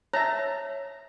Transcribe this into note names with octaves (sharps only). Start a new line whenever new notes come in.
C#5 E5 A5 A#5